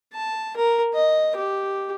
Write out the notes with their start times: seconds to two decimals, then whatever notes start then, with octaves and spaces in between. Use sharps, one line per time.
0.14 A5
0.56 A#4
0.94 D#5
1.36 G4